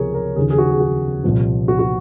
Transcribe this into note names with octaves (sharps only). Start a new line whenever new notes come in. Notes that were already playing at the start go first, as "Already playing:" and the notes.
Already playing: C#2 C3 F3 G#4 A#4 C#5
A#4
D#2 C#3 F3 G#4
G#4
F#4
G#4
F#4
C2 A#2 F3
F#4
F#4